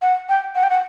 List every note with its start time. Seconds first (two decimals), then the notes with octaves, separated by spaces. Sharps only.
0.02 F#5
0.29 G5
0.55 F#5
0.63 G5
0.70 F#5